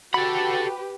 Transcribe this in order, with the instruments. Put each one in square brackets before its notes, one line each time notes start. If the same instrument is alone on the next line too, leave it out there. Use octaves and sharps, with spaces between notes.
[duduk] F#4 [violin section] G4 B4 [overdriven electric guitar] A4 F#5 [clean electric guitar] B5